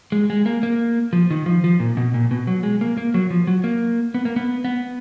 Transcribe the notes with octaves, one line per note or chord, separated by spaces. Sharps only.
G#3
G#3
A#3
A#3
F3
D#3
F3
F3
A#2
B2
A#2
B2
F#3
G#3
A#3
A#3
F#3
F3
F#3
A#3
B3
A#3
B3
B3